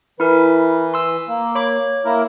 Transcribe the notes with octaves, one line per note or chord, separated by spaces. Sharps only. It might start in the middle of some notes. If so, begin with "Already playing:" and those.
E3 E4 A#4 B4
C6 E6
A#3
C#5 B5 D6
A#3 E4 A#4